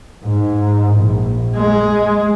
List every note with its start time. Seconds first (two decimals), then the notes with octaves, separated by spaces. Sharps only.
0.24 G#2
0.96 A#1
1.55 G#3